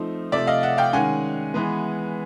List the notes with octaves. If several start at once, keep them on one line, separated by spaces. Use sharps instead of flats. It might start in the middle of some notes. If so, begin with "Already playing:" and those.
Already playing: F3 A3 C4 D#4
C3 F3 A3 D5 E5
D#5 F5
E5 F#5
F5 G5
D#3 G#3 C#4 F#5 G#5
E3 G#3 B3